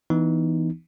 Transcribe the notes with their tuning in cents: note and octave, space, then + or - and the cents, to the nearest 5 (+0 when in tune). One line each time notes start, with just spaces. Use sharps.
E3 +0 B3 +0 D#4 +0